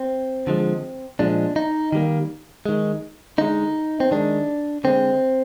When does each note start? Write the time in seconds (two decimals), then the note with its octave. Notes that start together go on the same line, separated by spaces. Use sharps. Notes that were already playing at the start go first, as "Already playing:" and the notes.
Already playing: C4
0.47 D3 F3 G#3
1.19 A#2 F3 G#3 D4
1.56 D#4
1.92 D#3 G3 A#3
2.66 D#3 G#3
3.38 D3 G#3 D#4
4.00 C4
4.11 D#3 G#3 D4
4.84 D3 G#3 C4